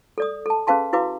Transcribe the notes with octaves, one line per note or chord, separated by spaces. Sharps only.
A4 D5 D#6
A4 A5
C#4 G#4 B4 F5 A5 C6
E4 F#4 B4 F5 D6